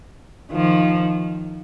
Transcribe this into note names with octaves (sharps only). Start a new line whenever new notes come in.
D#3 F3